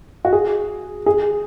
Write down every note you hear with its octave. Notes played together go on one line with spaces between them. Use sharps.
F#4
G#4
G#4